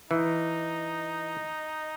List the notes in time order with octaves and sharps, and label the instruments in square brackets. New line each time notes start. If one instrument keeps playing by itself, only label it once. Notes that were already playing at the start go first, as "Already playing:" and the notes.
[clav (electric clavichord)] E3 [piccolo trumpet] D#4